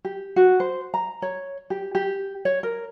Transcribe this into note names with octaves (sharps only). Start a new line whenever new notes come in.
G4
F#4
C5
A#5
C#5
G4
G4
C#5
A#4